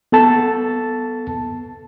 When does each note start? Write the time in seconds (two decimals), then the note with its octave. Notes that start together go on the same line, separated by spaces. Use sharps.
0.12 B3 A4 A5